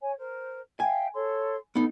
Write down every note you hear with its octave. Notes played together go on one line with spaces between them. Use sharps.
C#5 G#5
A#4 C5
E5 F5 G5 G#5
A4 C#5 C6
B3 D#4 A4